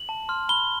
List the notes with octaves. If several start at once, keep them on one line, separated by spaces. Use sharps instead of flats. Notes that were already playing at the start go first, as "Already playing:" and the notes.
Already playing: F#7
A5
C6 F6
B5 G7